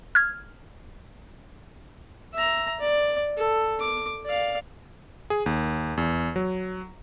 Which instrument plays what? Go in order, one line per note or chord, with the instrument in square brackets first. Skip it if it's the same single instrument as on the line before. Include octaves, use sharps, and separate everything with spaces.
[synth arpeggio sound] F6 G#6
[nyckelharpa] E5 A#5
D5
A4
D6
D5 F5
[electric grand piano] G#4
D#2
E2
F#3